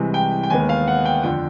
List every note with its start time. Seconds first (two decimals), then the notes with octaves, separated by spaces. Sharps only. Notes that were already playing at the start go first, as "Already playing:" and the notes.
Already playing: C2 C3 E3 G#3
0.14 G5
0.43 G5
0.50 D#2 D#3 G#3 B3 G#5
0.69 F5
0.87 F#5
1.05 G5
1.23 F2 D3 F3 G5